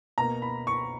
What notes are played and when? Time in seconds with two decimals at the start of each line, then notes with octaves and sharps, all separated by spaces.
0.18 B2 A#3 A#5
0.42 B5
0.67 C#6